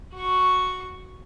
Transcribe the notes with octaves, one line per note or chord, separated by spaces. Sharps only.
F#4 C#6